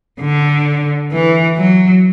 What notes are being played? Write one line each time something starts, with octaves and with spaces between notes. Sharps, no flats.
D3
E3
F#3